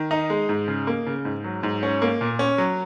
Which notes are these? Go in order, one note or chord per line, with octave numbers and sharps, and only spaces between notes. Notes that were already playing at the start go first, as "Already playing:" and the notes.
Already playing: D#3
D#4
G#3
G#2
C#3
A#3
C#3
G#2
F#3
G#2
C#4
A#3
A#2
C#4
F#3